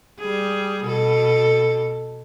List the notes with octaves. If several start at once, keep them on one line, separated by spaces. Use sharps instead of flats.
G3 G#4
B2 A4